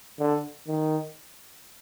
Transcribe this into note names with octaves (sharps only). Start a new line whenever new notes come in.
D3
D#3